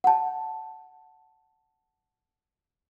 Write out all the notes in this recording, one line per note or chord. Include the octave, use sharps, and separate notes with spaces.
F#5 A5